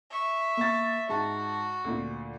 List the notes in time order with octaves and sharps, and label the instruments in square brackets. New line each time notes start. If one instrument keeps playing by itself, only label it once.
[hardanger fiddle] E5 C#6
[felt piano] A#3 A6
[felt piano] G#2 A5 [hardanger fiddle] F#4
[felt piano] D2 A#2